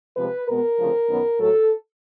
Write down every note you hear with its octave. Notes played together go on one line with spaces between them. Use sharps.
C3 F3 G#3 B4
B2 G#3 B3 A#4
D2 C#3 F3 A3 C4
F#2 D#3 F#3 B3
A2 F#3 A3 A4